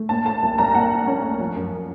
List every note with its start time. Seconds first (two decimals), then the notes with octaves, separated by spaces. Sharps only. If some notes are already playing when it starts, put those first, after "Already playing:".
Already playing: A3
0.09 A#2 A5
0.25 A3 A5
0.42 C2
0.58 C2 A#5
0.74 A#2 F#5
0.90 A#2
1.07 C#4
1.23 A3
1.40 F3
1.55 F#2